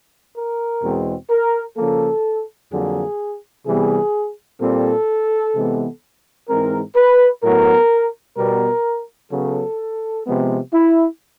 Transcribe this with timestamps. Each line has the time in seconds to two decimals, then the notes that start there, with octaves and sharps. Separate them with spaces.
0.37 A#4
0.83 E2 B2 G#3 C4
1.30 A#4
1.77 C#3 F3 A#3 A4
2.72 F2 D3 F#3 A#3 G#4
3.66 C3 E3 G3 B3 G#4
4.61 A#2 G3 C4 A4
5.55 C3 E3 G#3 B3
6.49 G#2 E3 G#3 C4 A#4
6.97 B4
7.43 A2 F#3 B3 A#4
8.38 B2 G3 B3 A#4
9.32 C#3 F#3 B3 A4
10.26 C3 F3 G#3 B3
10.73 E4